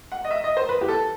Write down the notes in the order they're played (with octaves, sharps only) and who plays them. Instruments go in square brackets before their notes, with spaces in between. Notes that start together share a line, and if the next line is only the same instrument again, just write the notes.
[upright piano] F#5
D#5
E5
D#5
C5
B4
G4
A4